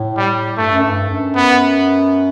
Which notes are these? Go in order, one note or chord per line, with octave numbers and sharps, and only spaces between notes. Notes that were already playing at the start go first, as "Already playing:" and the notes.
Already playing: A2
G3
G2 A3
F#2
G2
F#2
B3